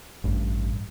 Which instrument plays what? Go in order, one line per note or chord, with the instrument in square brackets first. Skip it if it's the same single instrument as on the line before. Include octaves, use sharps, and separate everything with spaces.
[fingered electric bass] A1 G2